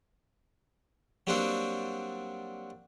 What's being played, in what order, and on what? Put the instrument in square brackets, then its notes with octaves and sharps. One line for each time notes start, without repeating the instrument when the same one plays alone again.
[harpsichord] F#3 G3 A#3 C4 D4 F#4